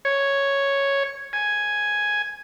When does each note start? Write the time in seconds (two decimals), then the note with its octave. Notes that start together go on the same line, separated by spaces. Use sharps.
0.05 C#5
1.33 G#5